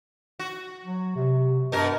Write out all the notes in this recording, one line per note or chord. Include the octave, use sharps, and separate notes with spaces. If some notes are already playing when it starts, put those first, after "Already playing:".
F#4
F#3
C3
G2 B2 A#4